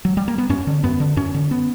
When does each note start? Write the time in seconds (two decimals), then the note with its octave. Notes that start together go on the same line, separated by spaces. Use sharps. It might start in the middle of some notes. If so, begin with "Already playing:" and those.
0.05 F#3
0.17 G3
0.28 A#3
0.38 B3
0.49 F#2 C#4
0.67 D3
0.83 F#2 B3
1.00 D3
1.16 F#2 C#4
1.34 D3
1.51 B3